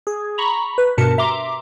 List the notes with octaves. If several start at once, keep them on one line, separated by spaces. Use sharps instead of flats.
G#4
A#5 B5 C#6
B4
G2 B2 A#4 A5 C#7
E5 A#5 C6 D6